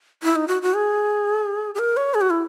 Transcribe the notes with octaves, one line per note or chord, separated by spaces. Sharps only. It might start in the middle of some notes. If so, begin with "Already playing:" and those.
E4
D#4
F#4
F#4
G#4
G#4
A#4
C#5
G#4
F#4
E4